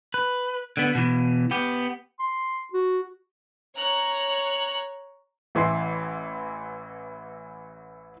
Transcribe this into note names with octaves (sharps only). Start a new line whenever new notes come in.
B4
D3 B3
B2 E3
B3 G4
C6
F#4
C#5 A#5 F#6
A1 E3 E4 C6 C7